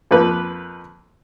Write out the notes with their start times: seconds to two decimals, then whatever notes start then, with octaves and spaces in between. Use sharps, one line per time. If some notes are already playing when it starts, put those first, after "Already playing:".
0.11 F2 F3 A#3 B4